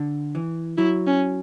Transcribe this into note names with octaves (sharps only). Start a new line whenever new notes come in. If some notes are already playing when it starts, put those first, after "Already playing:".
Already playing: D3
E3
F#3 E4
C#4